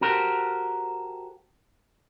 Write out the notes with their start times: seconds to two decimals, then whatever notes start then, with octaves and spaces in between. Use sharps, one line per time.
0.01 F#4 G4 A4 A#4 C5